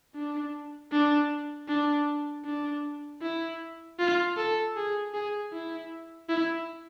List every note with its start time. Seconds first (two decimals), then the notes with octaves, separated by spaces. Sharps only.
0.15 D4
0.92 D4
1.69 D4
2.45 D4
3.22 E4
3.99 F4
4.37 A4
4.76 G#4
5.14 G#4
5.52 E4
6.29 E4